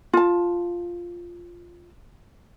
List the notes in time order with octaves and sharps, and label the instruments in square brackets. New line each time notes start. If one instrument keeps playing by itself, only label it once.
[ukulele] F4 A5